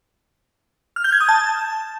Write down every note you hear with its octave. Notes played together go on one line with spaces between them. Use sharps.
F6
G6
G#6
D#6
A5